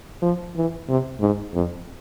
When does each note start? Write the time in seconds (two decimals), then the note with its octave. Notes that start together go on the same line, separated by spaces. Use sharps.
0.22 F3
0.56 E3
0.88 C3
1.20 G#2
1.54 F2